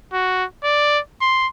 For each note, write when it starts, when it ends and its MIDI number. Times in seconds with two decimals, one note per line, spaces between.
0.13 0.45 66
0.64 0.99 74
1.21 1.47 84